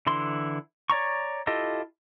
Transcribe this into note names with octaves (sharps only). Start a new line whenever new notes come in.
D3 E3 E4 C6
C#5 D5 A#5 C#6
E4 F4 G4 A4 D#5